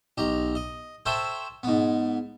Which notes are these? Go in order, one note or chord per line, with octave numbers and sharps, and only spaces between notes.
B1 G4 A#5
D#5
A4 C5 C#5 E5 G5
G#2 B3